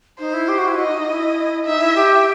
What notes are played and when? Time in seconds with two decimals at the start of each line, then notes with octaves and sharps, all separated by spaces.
0.19 D#4 C5
0.34 E4
0.48 G4
0.58 F#4
0.68 E4
0.77 F#4 D#5
0.87 D#4
0.98 D#4
1.08 E4
1.66 D#4 E5
1.80 E4
1.95 G4